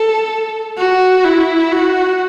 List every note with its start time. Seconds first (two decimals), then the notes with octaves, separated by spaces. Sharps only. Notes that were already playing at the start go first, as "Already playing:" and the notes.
Already playing: A4
0.77 F#4
1.24 E4
1.72 F#4